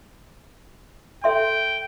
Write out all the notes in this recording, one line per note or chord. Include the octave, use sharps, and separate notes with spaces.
A4 E5 G5 C6